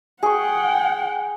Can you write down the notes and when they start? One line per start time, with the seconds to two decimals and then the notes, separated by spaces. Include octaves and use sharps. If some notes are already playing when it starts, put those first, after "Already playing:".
0.23 G#4 F#5 G5 C#6